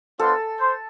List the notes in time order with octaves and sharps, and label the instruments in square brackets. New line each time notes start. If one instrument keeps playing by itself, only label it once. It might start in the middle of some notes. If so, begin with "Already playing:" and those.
[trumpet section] B3 D4 F4 C5 [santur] A4
[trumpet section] C5